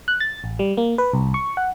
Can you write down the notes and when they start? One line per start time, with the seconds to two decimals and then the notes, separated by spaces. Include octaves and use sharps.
0.08 F#6
0.20 A6
0.44 A1
0.59 G3
0.77 A#3
0.98 B4
1.13 C2
1.34 C#6
1.57 F#5